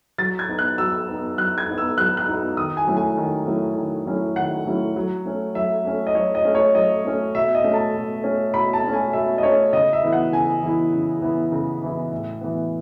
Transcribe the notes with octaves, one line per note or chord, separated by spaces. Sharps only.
F#3 A6
G#6
B3 D#4
F#6
F#3 E6
B3 D#4
F#3 F#6
G#6
B3 D#4
E6
F#3 F#6
F#6
B3 D#4
D#3 D#6
G#5
F#3 A3 C#4 E4
G#5
D#3
F#3 A3 C#4 E4
D#3
F#3 A3 C#4 E4
D#3 F#5
F#3 A3 C#4 E4
F#3
A3 C#4
F#3 E5
A3 C#4
D#5
F#3 C#5
D#5
A3 C#4
C#5
F#3 D#5
A3 C#4
B2 E5
D#5
A3 C#4
A5
B2
A3 C#4
B2 B5
A5
A3 C#4
G#5
B2 E5
D#5
A3 C#4 C#5
C#3 D#5
E5
E3 B3 E4
F#5
C#3 G#5
E3 B3 E4
C#3
E3 B3 E4
C#3
E3 B3 E4
A2
E3 B3